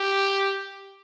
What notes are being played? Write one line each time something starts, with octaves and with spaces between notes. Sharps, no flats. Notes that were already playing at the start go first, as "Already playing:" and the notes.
Already playing: G4